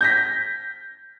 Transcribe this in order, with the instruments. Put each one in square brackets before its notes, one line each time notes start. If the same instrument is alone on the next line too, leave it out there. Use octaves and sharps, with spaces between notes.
[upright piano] G6 A#6 B6